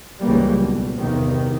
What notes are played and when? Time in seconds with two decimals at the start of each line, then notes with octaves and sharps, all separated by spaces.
0.20 C#2 F#2 E3 G3 A#3
0.61 B1
0.99 E2 G2 C3 D#3